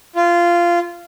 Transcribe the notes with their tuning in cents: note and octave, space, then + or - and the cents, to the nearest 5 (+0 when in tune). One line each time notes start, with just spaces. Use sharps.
F4 -15